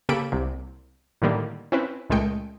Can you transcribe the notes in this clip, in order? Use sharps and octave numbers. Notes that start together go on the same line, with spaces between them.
C#3 A#3 G4 A4 B5 D7
C2 C3
A2 D3 D#3 G3 A#3
C4 C#4 E4 B4
C#2 A#2 G#3 A3 G5 C#7